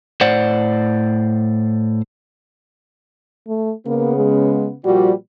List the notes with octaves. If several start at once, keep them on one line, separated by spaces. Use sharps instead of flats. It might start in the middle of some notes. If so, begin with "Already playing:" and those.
A2 C5 D5 F#5
A3
C#3 A#3 B3
G#3
A#2 F3 G3 F#4